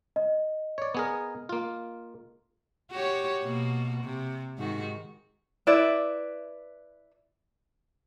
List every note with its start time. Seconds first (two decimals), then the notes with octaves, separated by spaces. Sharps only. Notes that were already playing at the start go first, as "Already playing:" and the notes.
0.16 D#5
0.78 C#5 D5
0.95 B3 G#4 A#4
1.49 A#3 F4
2.91 F#4 G4 C#5
3.42 B2 A#3 F#4
4.04 C3
4.57 G#2 D#3 F#4
5.67 E4 B4 D5 E5